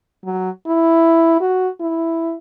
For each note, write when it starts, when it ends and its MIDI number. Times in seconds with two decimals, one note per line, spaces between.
0.25 0.50 54
0.67 1.36 64
1.41 1.68 66
1.81 2.35 64